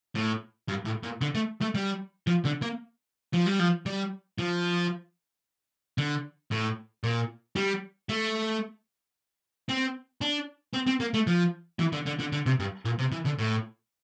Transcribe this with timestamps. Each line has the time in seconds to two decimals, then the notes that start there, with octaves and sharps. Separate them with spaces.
0.16 A2
0.69 G2
0.86 A2
1.04 A#2
1.21 D3
1.35 A3
1.61 A3
1.75 G3
2.27 F3
2.45 D3
2.62 A#3
3.33 F3
3.46 G3
3.59 F3
3.86 G3
4.39 F3
5.98 D3
6.51 A2
7.04 A#2
7.56 G3
8.09 A3
9.69 C4
10.21 D4
10.74 C4
10.87 C4
11.00 A#3
11.14 A3
11.27 F3
11.80 E3
11.93 D3
12.07 D3
12.20 D3
12.33 D3
12.46 C3
12.60 G2
12.85 A#2
12.99 C3
13.12 E3
13.26 D3
13.39 A2